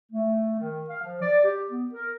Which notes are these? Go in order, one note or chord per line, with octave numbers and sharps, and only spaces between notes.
A3
D#3
F5
F3
D5
G4
B3
A#4